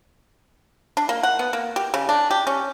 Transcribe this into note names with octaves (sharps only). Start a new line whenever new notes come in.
D4
A#3
F#5
B3
A#3
G4
C#3
D4
G4
C#4